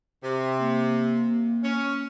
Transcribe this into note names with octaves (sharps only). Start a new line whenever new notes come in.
C3
A#3
C#4